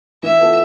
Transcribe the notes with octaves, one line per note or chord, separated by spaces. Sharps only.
E3 E5
B3 F4 A4